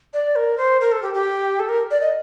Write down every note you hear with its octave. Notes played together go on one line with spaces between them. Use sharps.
D5
A#4
C5
A#4
A4
G4
G4
A4
A#4
D5
D#5